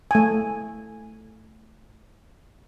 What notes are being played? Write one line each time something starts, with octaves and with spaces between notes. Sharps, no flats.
A3 G#5